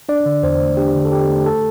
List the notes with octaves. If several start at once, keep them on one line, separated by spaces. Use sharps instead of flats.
D4 D5
D3
E2 C5
A3
D4 G4
D3
A4
E2 G4
A3
G4
A4